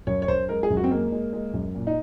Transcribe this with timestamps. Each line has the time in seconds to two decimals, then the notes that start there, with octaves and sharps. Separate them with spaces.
0.07 F#2 C#5
0.22 C#5
0.28 F#2 C5
0.49 G#3 A#4
0.63 G#4
0.70 F#2
0.77 F#4
0.84 C4
0.90 G#3 A#3
1.12 G#3
1.33 G#3
1.54 F#2
1.75 A#2
1.87 D#4